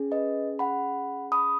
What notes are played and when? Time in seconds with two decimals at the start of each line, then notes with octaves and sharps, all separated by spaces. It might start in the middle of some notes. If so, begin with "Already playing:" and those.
Already playing: C#4 G#4
0.12 B4 D#5
0.59 F#5 B5
1.32 B5 D#6